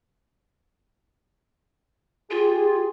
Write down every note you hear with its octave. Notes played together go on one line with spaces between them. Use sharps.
F4 G4 G#4